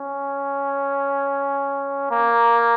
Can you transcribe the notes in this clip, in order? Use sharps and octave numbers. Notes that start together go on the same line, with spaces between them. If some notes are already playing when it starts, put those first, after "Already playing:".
Already playing: C#4
A#3